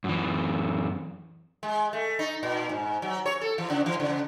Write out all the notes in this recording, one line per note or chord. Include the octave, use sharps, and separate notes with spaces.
F#2 E3
G#3
A3
D#4
A#2
G#2
F#3
C#5
A4
E3
C#3
E3
C#3